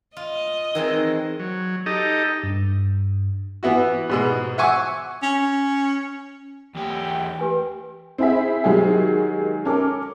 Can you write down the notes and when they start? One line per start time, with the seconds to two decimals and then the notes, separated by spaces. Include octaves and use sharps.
0.17 F4 D#5
0.75 D#3 E3 G#3 C4
1.39 F#3
1.86 D#4 G4 A4 D#5
2.43 G2
3.63 E3 B3 E4 F#4
4.10 G#2 B2 G#3
4.58 E5 F#5 G#5 C#6 D6 E6
5.23 C#4
6.75 E2 G4 G5
7.40 G4 B4 G#5
8.18 C4 E4 G#4 E5
8.64 D#3 F#3 G#3 G4 G#4
9.65 C#4 A4 A#4 D6